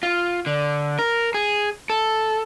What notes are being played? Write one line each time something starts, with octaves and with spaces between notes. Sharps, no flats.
F4
D3
A#4
G#4
A4